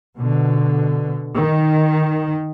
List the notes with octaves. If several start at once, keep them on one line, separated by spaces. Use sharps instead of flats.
B2 D3
D#3